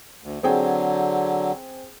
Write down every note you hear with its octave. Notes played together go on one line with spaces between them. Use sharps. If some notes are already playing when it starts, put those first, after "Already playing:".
D2
D3 F#3 C4 G#4 G5